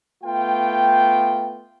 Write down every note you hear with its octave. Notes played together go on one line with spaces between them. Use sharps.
A3 B3 F4 G5